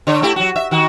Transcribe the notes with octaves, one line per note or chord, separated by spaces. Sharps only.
D3 C#5
A3 E4 G4
F#3 F#4
E5
D#3 F#4